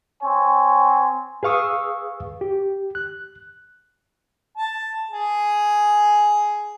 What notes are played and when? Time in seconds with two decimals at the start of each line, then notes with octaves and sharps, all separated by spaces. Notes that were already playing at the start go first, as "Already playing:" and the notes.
0.23 C4 C#5 G#5
1.43 G#4 B4 F5 C#6 D#6 E6
2.41 G4
2.95 F#6
4.57 A5
5.11 G#4